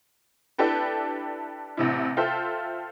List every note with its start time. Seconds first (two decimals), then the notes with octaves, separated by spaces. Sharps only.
0.58 D4 E4 G4 A4 B4
1.77 A1 C3 E4
2.17 F4 A4 C5 E5 G5